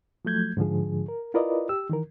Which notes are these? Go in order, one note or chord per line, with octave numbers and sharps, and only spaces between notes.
F3 F#3 A3 G6 G#6
G#2 D3 F3 G#4
A#4
E4 F4 A#4 B4 D5 D#5
G4 E6
D#3 E3 A#4